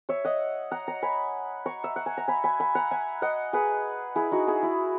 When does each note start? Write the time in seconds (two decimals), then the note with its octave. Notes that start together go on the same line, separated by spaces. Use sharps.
0.09 C#5 E5
0.24 D#5 F#5
0.71 F#5 A#5
0.88 F#5 A#5
1.02 G#5 B5
1.66 A#5 C#6
1.84 E5
1.96 F#5
2.06 G#5
2.17 A#5
2.28 G#5 B5
2.44 G#5 B5
2.60 G#5 B5
2.75 F#5 A#5
2.91 E5 G#5
3.22 D#5 F#5
3.53 G#4 B4
4.16 E4 G#4
4.31 D#4 F#4
4.47 E4 G#4
4.63 E4